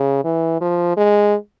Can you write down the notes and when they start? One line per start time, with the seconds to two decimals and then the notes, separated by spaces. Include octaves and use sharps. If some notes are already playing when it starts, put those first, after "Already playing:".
Already playing: C#3
0.24 E3
0.61 F3
0.97 G#3